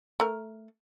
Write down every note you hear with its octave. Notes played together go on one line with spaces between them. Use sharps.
A3 A#4